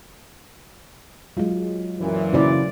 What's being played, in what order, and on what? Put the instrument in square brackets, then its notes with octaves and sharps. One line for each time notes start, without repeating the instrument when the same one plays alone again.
[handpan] F#3 G#3 [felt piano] F4
[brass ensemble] F#2 A#2 E3
[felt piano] C#3 F#3 E4 [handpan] A#3 C5 D5